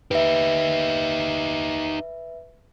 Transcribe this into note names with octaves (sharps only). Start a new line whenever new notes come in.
D#4 G4 B4 E5